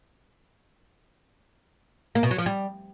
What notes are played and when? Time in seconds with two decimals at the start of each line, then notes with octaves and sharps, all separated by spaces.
2.15 A#3
2.23 B2
2.31 F#3
2.38 F3
2.46 G3